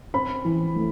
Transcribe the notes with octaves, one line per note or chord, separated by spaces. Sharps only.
C4 B5
E3
A3